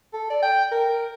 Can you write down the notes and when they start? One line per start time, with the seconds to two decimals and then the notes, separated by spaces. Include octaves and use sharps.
0.13 A4
0.30 D5
0.42 G5
0.72 A#4